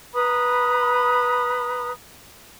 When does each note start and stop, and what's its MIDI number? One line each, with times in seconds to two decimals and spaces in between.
0.15 1.92 71
0.15 1.92 82
0.15 1.92 83
0.15 1.92 87